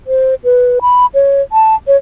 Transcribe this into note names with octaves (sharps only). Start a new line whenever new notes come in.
C5
B4
B5
C#5
A5
C#5